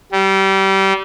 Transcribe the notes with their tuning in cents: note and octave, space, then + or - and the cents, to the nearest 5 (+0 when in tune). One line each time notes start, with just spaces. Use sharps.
G3 -25